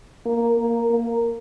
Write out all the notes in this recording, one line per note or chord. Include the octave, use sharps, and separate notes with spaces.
A#3
A#3
A#3